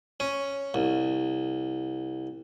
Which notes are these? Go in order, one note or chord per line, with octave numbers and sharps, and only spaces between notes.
C#4
C2